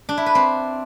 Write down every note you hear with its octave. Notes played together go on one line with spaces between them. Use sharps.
D4
E4
B4
C4